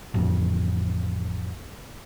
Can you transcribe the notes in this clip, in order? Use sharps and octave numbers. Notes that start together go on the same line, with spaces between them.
A1 F2